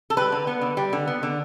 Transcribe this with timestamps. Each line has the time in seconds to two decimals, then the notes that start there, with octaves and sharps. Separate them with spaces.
0.10 A4
0.17 G3 B4
0.32 D3
0.47 B3
0.61 D3
0.77 G3
0.93 D3
1.07 B3
1.23 D3